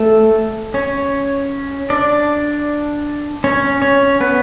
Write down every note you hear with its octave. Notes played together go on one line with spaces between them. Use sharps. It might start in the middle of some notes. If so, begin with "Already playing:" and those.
Already playing: A3 A4
C#4 C#5
D4 D5
C#4 C#5
C#4 C#5
B3 B4